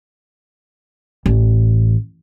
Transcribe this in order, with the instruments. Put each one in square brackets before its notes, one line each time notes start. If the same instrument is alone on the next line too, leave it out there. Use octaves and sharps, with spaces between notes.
[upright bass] A1